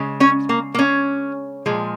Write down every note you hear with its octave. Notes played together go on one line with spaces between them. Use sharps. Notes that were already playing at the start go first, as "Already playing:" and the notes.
Already playing: C#3 G#3
C#4 C#5
A#3
A#3
C#4
A#2 F3 G#3